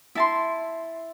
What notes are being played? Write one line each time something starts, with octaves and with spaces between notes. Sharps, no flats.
E4 A5 C6